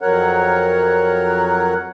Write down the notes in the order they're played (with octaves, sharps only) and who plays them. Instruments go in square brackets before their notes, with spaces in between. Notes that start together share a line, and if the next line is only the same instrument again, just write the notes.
[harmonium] F2 F#3 A#4 C#5 F#5